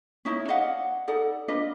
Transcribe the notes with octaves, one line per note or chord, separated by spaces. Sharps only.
C#4 D#4 E4
D5 D#5 F5 F#5
D#4 A4 D5 F#5
D4 F4 B4 D#5